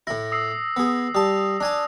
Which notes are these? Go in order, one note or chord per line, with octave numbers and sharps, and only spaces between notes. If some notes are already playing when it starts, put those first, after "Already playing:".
A2 E4 A#6
D#6 E6 C7
B3 G#4
G3 A5 D#6
D4 G#5 A5